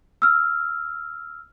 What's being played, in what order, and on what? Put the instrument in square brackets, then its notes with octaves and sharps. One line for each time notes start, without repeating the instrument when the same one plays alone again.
[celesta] E6 F6